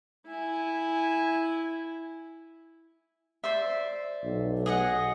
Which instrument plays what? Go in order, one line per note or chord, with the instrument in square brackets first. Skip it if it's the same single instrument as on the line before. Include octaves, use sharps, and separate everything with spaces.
[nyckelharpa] E4 G#5
[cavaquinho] C5 D5 E5
[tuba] B1
[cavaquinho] G#4 D#5 F#5